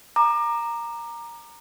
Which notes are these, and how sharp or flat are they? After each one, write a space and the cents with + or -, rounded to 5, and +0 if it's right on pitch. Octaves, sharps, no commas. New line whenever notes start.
A#5 +0 D6 +30